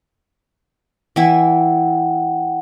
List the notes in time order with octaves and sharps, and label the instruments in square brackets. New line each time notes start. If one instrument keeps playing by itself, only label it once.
[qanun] E3 E4 [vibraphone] F#5 G5